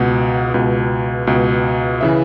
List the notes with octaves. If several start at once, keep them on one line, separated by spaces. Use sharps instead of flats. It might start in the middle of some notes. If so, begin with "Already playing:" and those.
Already playing: C#2 B2 F#5
C#2 B2
C#2 B2
C#3 E3 E5